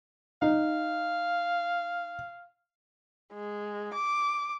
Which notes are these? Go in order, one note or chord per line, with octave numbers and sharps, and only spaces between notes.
D#4 F5
G#3
D6